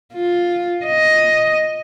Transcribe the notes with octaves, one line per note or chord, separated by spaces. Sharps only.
F4
D#5